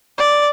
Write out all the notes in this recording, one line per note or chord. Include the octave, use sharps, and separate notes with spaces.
D5